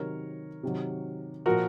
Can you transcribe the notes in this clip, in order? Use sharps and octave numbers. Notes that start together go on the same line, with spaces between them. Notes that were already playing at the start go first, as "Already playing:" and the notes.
Already playing: C3 D#3 F#3 A#4 C#5
C3 D#3 F#3
A#2 F3 F#4 A#4